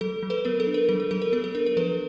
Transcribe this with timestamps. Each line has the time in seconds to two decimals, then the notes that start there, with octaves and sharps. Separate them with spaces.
0.01 F#3 A4
0.23 F#3
0.30 A4 B4
0.45 B3 A#4
0.60 A4
0.67 D4
0.74 A#4
0.89 F#3 A4
1.00 A#4
1.11 F#3 A4
1.22 A#4
1.33 B3 A4
1.44 A4
1.55 D4 A#4
1.66 A#4
1.77 F3 A4 B4